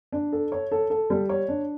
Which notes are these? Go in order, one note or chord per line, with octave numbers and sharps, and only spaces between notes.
D4
A4
C#5
A4
A4
G3
C#5
D4